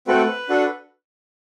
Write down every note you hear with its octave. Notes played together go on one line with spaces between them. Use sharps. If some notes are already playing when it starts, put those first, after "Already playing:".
A3 C4 F#4 A4 B4
D4 F#4 A4